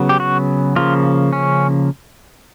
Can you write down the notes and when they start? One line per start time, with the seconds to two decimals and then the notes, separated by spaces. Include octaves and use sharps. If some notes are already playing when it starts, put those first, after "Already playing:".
Already playing: C#3 F#3 B3
0.09 G4
0.20 F#4
0.76 C#3 F3 A#3 F4
1.33 C#4